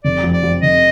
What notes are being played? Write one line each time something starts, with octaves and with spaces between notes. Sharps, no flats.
F1 D5
F2
D5
F2
F1 D#5